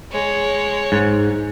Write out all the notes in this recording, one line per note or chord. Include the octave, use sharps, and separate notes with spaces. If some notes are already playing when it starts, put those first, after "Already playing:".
G#3 C#5
G#2